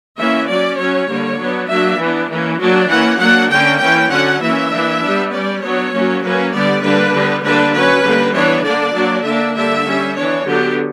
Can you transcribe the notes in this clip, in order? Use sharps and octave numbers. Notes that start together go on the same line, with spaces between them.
E3 A#3 C#4 E5
F#3 C#4 D5
F#3 C#4 C#5
D3 G3 A#3
F#3 B3 D4
F#3 A#3 D4 E5
E3 B3 D4
E3 A#3 C#4
F#3 A#3 D4
E3 A#3 C#4 F#5
F#3 A#3 D4 F#5
D3 A#3 C#4 G5
E3 A#3 C#4 G5
D3 F#3 C#4 F#5
E3 A#3 C#4 E5
E3 A#3 D4
G3 B3 D4
G3 C#4 D5
F#3 B3 D4 C#5
F#3 A#3 C#4
F#3 A#3 C#4 B4
D3 G3 B3 D5
D3 G3 A#3 D4 B4
D3 G3 B3
D3 G3 A#3 D4 B4
F#3 C#4 B4
D3 G3 A#3
E3 B3 D4 C#5
D3 A#3 D4 D5
F#3 A#3 D4
D3 A#3 D4 E5
D3 G3 A#3 D4 E5
G3 C#4
E3 B3 D4 C#5
D3 F#3 B3 D4 G4